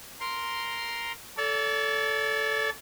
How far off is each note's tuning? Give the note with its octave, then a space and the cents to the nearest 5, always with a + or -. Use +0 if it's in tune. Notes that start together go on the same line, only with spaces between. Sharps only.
A#4 +0 C6 +0
A4 +0 D5 -40